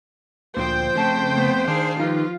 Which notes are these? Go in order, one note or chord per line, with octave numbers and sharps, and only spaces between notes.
D2 A#2 E3 F3 C5 G5
F2 C#3 A3 A5
A3 B3
D#3 D4 G#4 F5
F3 D#4 F4 G4 B4